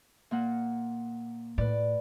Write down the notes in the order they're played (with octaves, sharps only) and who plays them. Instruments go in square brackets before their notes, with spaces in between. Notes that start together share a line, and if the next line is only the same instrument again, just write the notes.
[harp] A#2 A#3 F#5
[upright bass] A2 [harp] B4 D5